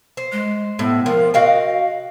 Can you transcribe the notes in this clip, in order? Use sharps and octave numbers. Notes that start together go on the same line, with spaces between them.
C5
G#3
A2 B3
F3 A#4
F#4 D#5 F5 G5